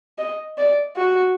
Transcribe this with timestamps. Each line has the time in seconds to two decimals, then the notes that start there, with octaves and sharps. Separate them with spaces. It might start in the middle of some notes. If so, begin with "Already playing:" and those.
0.18 D#5
0.58 D5
0.96 F#4